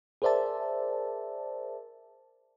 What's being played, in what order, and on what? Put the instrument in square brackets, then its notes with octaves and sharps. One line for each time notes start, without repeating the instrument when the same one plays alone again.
[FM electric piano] G#4 A#4 C5 D5 E5 A5